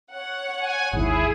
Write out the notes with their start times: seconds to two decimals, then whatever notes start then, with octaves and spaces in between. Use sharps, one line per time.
0.13 C#5 F#5
0.60 G#5
0.93 G#1 D#2 E4 G#4